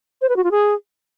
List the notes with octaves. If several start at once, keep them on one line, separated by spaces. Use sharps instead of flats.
C5
B4
F#4
F4
G#4